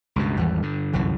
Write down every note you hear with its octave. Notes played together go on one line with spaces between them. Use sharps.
C#2 G2 B2
G#1 E2 E3 G3
G2 D3
G1 C2 F#2 E3